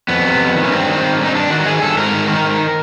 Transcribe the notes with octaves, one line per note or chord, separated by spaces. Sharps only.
F2 B3
C3
F2
D#3
C#4
G2 C4
D#3
D#3
G2
D#4
G2 D4
D#3 F#4
D#3 G#4
G2 A4
G#2 A#4
D#3
D#3
G#2